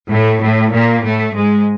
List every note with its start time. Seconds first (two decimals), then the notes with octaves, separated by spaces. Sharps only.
0.11 A2 A3
0.42 A2 A3
0.73 A#2 A#3
1.04 A2 A3
1.34 G#2 G#3